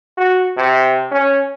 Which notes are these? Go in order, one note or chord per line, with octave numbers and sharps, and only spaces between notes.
F#4
C3
C#4